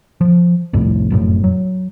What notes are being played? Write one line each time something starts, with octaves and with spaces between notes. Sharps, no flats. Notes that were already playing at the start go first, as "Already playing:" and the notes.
F3
C2 F2 A2
F1 F#2 A2
F#3